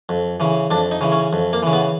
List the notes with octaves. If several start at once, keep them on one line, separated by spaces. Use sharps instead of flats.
F2
C#3 E3
F2 D4
D#4
C#3 E3
C#4
F2
A#3
C#3 E3
B3